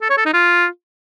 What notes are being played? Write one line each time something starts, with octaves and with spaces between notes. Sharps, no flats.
A4
C#5
A4
D#4
F4